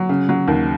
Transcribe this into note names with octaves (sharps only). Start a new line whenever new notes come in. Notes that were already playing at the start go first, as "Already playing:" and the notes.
Already playing: F#3
C#3
F#3
D#2